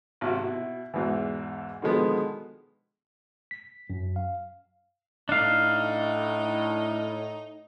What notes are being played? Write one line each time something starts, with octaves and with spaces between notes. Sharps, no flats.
G#1 C3 F#4
B2 E4
E2 G#2 B2 E3
B2 D3 D#3 F3 G#3 B3
B6
F#2
F5
A2 D4 D#4 F5